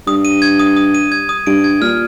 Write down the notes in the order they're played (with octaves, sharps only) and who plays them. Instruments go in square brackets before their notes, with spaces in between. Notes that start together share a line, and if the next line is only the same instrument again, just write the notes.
[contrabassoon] G2 [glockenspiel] D#6
[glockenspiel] D#7
G#6
D#6
D#6
D#7
G#6
D#6
[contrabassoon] G2 [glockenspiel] D7
[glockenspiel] G#6
[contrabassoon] A#2 [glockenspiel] F6